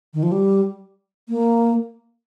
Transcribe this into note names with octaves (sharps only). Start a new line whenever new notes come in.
D#3
F3
G3
A#3